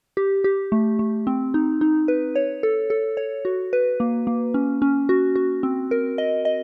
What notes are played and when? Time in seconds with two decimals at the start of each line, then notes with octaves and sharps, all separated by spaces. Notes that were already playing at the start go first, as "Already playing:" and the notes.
0.17 G4
0.44 G4
0.72 A3
0.99 A3
1.27 C4
1.54 D#4
1.81 D#4
2.08 B4
2.35 C#5
2.63 A4
2.90 A4
3.17 C#5
3.45 F#4
3.73 B4
4.00 A#3
4.27 A#3
4.54 C#4
4.82 C#4
5.09 F#4
5.36 F#4
5.63 C4
5.91 A#4
6.18 D#5
6.45 D#5